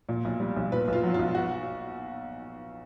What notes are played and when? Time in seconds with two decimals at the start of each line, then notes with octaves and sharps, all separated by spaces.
0.09 A#2
0.25 B1
0.40 G3
0.56 B1
0.72 A#2 B4
0.88 B1 F4
1.04 F#3
1.14 B1 F4
1.35 F#4